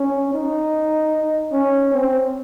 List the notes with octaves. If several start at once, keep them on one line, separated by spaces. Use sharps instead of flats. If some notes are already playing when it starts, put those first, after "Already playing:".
Already playing: C#4
D#4
C#4
C4